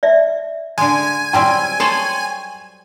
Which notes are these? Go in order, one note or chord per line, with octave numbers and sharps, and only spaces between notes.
D5 E5
D3 G#3 G#5
F#3 G3 C4 G5
A4 C5 C#5 A5 C6 C#6